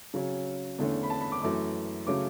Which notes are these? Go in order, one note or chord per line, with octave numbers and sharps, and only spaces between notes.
C#3 F#3 C#4
E2 D3 A3 C#4
B5
A5
B5
D6
F#2 E3 A3 D6
C#3 F#3 A3 C#4 D6